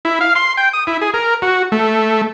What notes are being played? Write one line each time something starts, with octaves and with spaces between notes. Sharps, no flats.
E4
F5
C6
G5
D#6
E4
G#4
A#4
F#4
A3